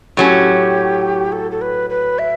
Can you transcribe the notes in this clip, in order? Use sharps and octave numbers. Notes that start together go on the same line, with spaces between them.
A2 F#3 C#4 G4 A4
A4
A4
B4
B4
E5